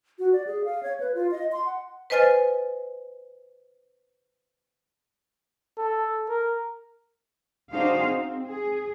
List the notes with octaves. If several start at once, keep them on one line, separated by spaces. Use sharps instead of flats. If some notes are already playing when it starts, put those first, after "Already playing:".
F#4
D5
G#4
F5
C#5
B4
F4
D#5
C6
F#5
B4 C5 D#5 G#5 F6 A6
A4
A#4
D4 D#4 F#4 G#4 C5 F5
C4
G#4